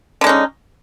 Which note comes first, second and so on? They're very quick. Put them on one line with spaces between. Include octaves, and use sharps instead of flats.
D3 G#3 D#4 C#4